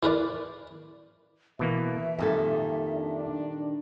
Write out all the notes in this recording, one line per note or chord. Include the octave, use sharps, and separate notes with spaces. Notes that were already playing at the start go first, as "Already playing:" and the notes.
E3 A#4 B4 D5
B2 E3 A#3 E5
F2 A#2 D#3 G3 A4
D4